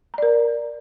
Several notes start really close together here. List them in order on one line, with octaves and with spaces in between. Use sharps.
A#5 D5 A#4